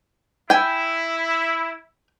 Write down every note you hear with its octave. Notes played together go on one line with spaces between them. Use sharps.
E4 G5 G#5